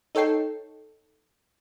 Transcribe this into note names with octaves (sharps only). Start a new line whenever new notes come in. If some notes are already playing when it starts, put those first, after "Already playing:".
D#4 A4 C#5 G5 C7